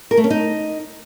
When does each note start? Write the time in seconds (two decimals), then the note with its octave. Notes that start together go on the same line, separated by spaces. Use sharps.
0.11 A#4
0.17 A3
0.24 C#4
0.30 D#4